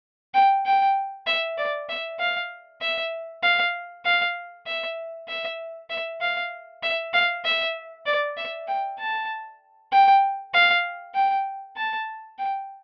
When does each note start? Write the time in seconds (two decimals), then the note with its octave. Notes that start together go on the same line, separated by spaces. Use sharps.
0.34 G5
0.66 G5
1.27 E5
1.58 D5
1.89 E5
2.20 F5
2.82 E5
3.43 F5
4.05 F5
4.67 E5
5.28 E5
5.90 E5
6.21 F5
6.83 E5
7.14 F5
7.45 E5
8.06 D5
8.37 E5
8.68 G5
8.99 A5
9.92 G5
10.54 F5
11.15 G5
11.77 A5
12.38 G5